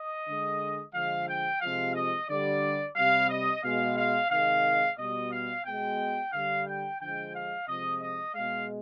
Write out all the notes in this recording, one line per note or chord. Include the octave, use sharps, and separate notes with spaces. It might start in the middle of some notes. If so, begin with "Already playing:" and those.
Already playing: D#5
D3 G#3
D3 F3 G#3 F5
G5
C3 F3 G#3 F5
D#5
D3 G3 D5
C3 G3 F5
D#5
B2 G#3 F5
F5
C3 D#3 G#3 F5
B2 G3 D#5
F5
B2 G#3 G5
D3 G3 F5
G5
D3 F3 G#3 G5
F5
C3 F3 G#3 D#5
D#5
B2 G#3 F5